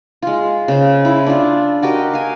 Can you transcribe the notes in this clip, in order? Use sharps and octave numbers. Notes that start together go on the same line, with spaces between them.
G#3 F4
C#3 C5
E4
D4 F4
F#4 G4 A#4 D#5
F5 G#5